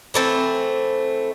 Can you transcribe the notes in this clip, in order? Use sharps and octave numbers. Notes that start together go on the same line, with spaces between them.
E3 A3 C4